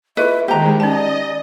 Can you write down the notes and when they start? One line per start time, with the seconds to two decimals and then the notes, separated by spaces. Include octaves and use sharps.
0.17 E4 F4 B4 D#5 E5
0.48 D#3 G#3 G4 C5 A#5
0.80 C#4 D#4 D5 D#5 A5